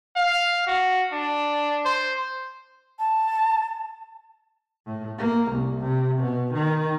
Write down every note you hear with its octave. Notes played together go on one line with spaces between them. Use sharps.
F5
F#4
D4
C5
A5
A2
A#3
C2
C3
B2
D#3